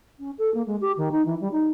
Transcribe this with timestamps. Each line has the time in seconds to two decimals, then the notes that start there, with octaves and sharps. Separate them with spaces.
0.19 C#4
0.38 A4
0.54 A#3
0.67 G#3
0.81 G4
0.97 D#3
1.12 D#4
1.26 E3
1.40 G3
1.52 D#4